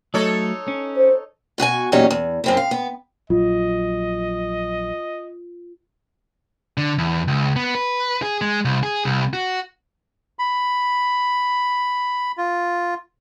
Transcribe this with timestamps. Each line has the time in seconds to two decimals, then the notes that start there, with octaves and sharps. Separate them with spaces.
0.14 F#3 A3 D#4 A4 C#5
0.68 C#4
0.96 C5
1.58 B2 F#4 D#5 G#5
1.92 E2 A#2 F#3 G3 C#4 D#4
2.11 E2
2.44 F#2 C4 E4
2.57 F5
2.71 B3
3.30 A#1 F#3 F4 D#5
6.77 D3
6.98 E2
7.28 C#2
7.56 B3
7.75 B4
8.22 G#4
8.41 G#3
8.65 C2
8.83 G#4
9.05 C2
9.33 F#4
10.39 B5
12.37 F4